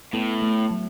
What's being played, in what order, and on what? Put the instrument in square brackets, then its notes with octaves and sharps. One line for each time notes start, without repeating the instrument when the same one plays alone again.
[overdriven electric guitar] A2 [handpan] B3
[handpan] A3
F#3